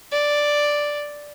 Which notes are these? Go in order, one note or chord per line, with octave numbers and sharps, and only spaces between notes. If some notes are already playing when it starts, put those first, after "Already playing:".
D5